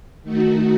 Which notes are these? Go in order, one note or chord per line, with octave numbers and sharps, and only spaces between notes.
D#3 A3 D#4 F#4